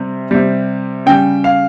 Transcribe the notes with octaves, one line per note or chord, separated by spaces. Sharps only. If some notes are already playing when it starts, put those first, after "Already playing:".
Already playing: C3 G3
C3 G3
C#3 G3 G5
F5